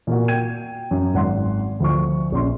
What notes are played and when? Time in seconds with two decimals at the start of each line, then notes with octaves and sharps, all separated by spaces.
0.07 A#2 A#3 F#4
0.28 G5 G#6 D#7
0.91 F#2
1.14 G#1 F#5 C6
1.80 D2 F3 C#6
2.32 A#1 C#4 C6